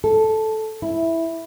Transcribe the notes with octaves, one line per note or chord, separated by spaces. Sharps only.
A4
E4